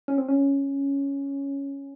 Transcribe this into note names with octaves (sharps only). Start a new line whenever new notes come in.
C#4
C4
C#4